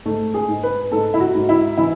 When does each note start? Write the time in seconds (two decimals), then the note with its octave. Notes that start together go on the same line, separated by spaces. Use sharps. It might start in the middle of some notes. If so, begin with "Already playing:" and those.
0.05 G#2 A3
0.34 G#4
0.48 G#2
0.63 B4
0.92 G#2 A4
1.14 E4
1.20 F#4
1.35 G#2
1.49 E4
1.77 E3 E4